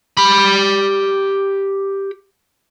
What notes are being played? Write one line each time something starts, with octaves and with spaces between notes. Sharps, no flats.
G4 B5